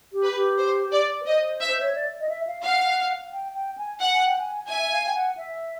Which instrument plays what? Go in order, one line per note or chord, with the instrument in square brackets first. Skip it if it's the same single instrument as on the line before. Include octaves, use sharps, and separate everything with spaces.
[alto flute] G4
[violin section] B4
[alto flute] G4
[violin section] C5
D5
[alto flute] B4
[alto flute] C5 [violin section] D#5
[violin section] E5
[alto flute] C5
C#5
D5
D#5
E5
F5
[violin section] F5 [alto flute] F#5
[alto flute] G5
G5
G#5
[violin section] F#5
[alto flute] G#5
G5
G#5
[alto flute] E5 [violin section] G#5
[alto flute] E5
F5
G5
F#5
E5